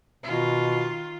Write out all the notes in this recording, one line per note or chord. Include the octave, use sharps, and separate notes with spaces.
B2 D#3 F4